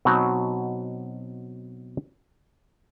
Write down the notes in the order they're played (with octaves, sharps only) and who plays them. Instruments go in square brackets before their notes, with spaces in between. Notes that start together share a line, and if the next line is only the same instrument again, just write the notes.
[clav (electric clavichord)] B2 F#3 C4 D#4 F#4